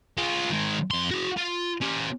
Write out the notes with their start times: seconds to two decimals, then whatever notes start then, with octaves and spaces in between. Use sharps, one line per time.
0.18 F4 G#4
0.50 D#3 G#3
0.91 F2 C6
1.11 F#4 G#4
1.37 F4
1.82 C#4 G4